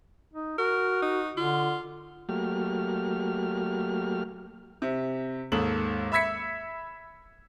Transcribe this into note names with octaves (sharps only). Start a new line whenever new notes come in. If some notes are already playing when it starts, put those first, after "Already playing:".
D#4
F#4 A#4
D#4
D3 F4
F#3 A3 A#3 G4 F6
C3
D#2 G#2 A4 F#7
E5 B5 E6 G#6 B6 C#7